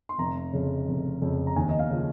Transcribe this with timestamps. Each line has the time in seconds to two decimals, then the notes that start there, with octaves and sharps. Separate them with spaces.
0.09 C6
0.18 F1 A#5
0.53 F2 C#3
0.88 F1
1.22 F2 C#3
1.47 A#5
1.56 D#2 G#5
1.69 D#5
1.79 F5
1.90 C#3 F3